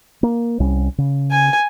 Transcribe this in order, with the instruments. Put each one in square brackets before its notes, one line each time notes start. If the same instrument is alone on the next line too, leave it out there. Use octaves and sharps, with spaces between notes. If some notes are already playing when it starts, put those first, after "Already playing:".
[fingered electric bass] A#3
C2 G3 C#4
C#3
[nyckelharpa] G#5